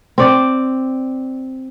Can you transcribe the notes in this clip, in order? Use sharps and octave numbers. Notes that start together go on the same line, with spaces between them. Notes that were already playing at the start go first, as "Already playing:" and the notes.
C4 D5